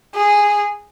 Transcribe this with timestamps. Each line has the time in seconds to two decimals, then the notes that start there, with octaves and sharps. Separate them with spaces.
0.14 G#4